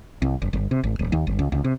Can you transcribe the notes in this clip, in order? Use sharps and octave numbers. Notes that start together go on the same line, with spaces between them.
C2
F#1
G1
C3
G#1
D1
D#2
G1
C#2
C#2
C3